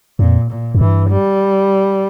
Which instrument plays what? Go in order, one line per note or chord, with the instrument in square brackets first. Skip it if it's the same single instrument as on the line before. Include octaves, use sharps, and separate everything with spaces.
[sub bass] F2 [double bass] A#2
[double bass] A#2
[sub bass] F2
[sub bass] G2 [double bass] E3
[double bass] G3